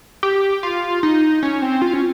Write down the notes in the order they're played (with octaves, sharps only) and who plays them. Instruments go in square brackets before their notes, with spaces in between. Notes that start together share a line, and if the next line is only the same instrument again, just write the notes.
[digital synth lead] G4
F4
D#4
C#4
C4
F4
C#4